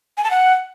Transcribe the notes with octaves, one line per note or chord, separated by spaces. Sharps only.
G#5
A5
F#5